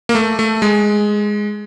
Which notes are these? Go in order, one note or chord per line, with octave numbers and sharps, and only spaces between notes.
A#3
A3
A3
G#3